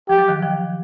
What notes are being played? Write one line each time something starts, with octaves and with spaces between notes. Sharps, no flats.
F3 G4
F#3
D#3 F3
D#3 F3